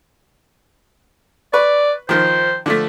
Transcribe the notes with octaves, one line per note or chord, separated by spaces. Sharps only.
B4 D5 C#6
D#3 F3 C5
D3 F3 A3